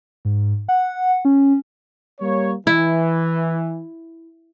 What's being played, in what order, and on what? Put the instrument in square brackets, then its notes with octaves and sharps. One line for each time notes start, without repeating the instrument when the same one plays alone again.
[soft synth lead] G#2
F#5
C#4
[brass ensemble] G3 A#3 C#5
[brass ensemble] E3 [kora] E4